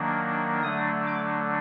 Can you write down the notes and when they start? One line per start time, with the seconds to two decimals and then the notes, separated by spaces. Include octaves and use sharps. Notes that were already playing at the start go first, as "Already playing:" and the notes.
Already playing: D#3 F#3 A#3 D4
0.63 D3 F#3 A3 D4 D#6
1.07 D6